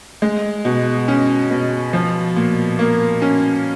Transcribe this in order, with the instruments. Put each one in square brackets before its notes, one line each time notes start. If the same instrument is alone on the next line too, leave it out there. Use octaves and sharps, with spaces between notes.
[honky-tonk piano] G#3
B2
C#4
B2
F3
A#2
A#3
C#4